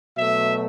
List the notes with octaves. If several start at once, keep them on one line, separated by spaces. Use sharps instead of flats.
B2 F#3 A3 E5